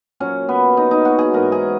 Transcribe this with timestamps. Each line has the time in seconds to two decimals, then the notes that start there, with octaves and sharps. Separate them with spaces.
0.20 A#2 F#3 C#4
0.49 B3
0.77 D#4
0.91 D#4
1.05 F#4
1.19 G#4
1.34 G#2 E3 A#4
1.52 G#4